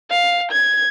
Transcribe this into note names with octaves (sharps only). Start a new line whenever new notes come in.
F5
G#6